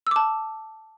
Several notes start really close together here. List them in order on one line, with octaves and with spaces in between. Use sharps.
E6 D6 A5